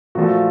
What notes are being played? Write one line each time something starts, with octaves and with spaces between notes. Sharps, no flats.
A#2 F3 A3 F#4